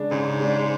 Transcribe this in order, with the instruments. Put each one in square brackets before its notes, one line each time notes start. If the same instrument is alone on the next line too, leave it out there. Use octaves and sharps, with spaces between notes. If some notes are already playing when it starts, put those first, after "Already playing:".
Already playing: [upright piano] C#3 G#3 D4
[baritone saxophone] G#2 [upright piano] C#3
[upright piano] G#3 D4